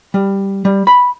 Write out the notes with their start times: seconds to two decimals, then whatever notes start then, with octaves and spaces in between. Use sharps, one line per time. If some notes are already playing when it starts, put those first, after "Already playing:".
0.14 G3
0.65 G3
0.87 B5